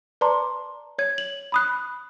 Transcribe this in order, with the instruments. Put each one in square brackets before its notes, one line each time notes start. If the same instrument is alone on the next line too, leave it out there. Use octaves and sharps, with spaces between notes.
[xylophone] B4 D5 A5 A#5 C6 D6
C#5 G#6
F#7
B5 D#6 F#6